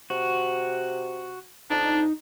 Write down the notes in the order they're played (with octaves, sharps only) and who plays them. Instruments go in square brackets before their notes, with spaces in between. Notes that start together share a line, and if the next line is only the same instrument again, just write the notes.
[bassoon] C3 [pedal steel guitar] F#4
[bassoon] F2 [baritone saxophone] D4 [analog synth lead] D#4